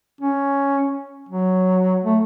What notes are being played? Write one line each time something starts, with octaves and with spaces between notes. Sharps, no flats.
C#4
F#3
A3